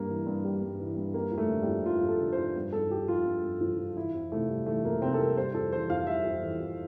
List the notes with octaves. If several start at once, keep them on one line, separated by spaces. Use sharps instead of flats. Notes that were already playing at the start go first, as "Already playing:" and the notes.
Already playing: G2 G3 A#3
E3
G2
G3
G2
E3
G2
G3 A#3
F2
A3
D3
G3
F2
G3 F4
F2
A4
D3
F2 C5
G2
G2 A4
F3 G4
F3 F4
G2
G2
F3
F3
E3 E4
F2
C3 A3
G3
E3 A3
F2 A#3
C3 C4
A4
G3 A#4
G3 C5
F2 A4
E3 C5
F2 F5
G3 E5
F2
E3
F2